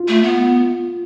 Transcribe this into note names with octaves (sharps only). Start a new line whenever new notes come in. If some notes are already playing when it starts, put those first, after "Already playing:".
Already playing: F4
A3
B3